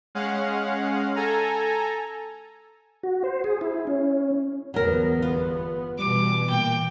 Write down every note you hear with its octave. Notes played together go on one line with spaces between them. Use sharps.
G#3 C#4 F5 F#5
A4 G#5 A#5
F#4
C5
G#4
E4
C#4
G1 E2 F#3 B3 A#4
F4
B2 E3 G3 D6
A#2 G5